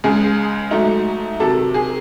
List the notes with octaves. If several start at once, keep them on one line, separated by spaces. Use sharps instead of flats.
C#2 C#3 G#3 G#4
G#2 F#3 A3 D#4
C3 D#3 F#3 A4
G#4